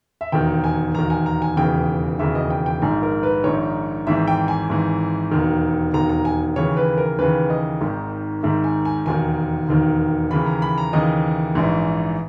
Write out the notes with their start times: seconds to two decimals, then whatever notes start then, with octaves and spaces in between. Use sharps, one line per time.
0.21 E5
0.32 E1 D#2 D#3 G5
0.64 G#5
0.94 E1 D#2 D#3 A#5
1.10 G#5
1.26 A#5
1.42 G#5
1.57 E1 D#2 C#3 E3 G5
2.19 E1 D#2 C#3 E3 E5
2.35 D#5
2.50 G5
2.66 G5
2.82 A#1 G#2 D#3 G#5
3.03 A#4
3.23 B4
3.44 A#1 G#2 D#3 C#5
4.07 G#1 G#2 E3 E5
4.27 G5
4.48 G#5
4.69 G#1 G#2 E3
5.31 E1 D#2 D#3
5.94 E1 D#2 D#3 A#5
6.09 A#5
6.25 G#5
6.56 D#2 C#3 E3 C#5
6.77 B4
6.98 A#4
7.19 D#2 C#3 E3 B4
7.50 D#5
7.81 G#1 G#2 D#3
8.43 G#1 G#2 D#3 E5
8.64 G#5
8.85 G#5
9.06 E1 D#2 D#3 G#5
9.68 E1 D#2 D#3
10.31 D#2 C#3 E3 B5
10.46 A#5
10.62 B5
10.78 A#5
10.93 D#2 C#3 E3 D#5
11.55 A#1 G#2 E3